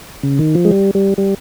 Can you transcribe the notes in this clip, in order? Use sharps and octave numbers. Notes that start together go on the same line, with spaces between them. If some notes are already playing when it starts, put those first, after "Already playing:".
C#3
D#3
F3
G#3
G3
G3
G3